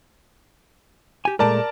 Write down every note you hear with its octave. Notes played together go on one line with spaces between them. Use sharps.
G4 G#5
A#2 G#3 A3 A#4 D5 A5